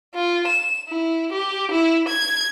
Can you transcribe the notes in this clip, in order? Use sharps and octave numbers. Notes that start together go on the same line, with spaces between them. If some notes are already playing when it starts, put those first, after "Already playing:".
F4
E7
E4
G4
E4
G#6